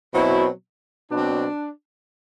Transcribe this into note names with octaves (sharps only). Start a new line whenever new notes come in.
B2 F#3 C4 E4
B2 F#3 C4 D4